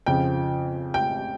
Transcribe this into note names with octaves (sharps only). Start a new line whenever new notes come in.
F2 C#3 F3 G5
G5